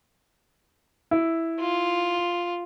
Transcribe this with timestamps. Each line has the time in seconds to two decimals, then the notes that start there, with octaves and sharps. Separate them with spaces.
1.11 E4
1.60 F4